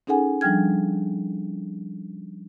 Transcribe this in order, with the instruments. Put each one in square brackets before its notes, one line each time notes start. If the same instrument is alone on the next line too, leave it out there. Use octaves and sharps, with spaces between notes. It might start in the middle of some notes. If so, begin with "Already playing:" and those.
[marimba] C#4 D#4 G#4 A4 F#5 G#5
F3 G3 D4 G5 F6 G#6